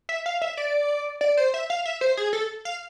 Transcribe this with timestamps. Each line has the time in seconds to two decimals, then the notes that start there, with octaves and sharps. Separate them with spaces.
0.09 E5
0.26 F5
0.42 E5
0.57 D5
1.21 D5
1.37 C5
1.54 E5
1.70 F5
1.85 E5
2.01 C5
2.17 G#4
2.33 A4
2.65 F5